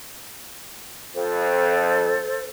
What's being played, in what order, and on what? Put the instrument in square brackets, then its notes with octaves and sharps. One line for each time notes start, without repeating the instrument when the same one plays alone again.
[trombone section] F2 [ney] A4 [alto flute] C5